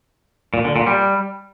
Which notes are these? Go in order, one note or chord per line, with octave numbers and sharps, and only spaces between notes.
A#2
D3
A#2
G3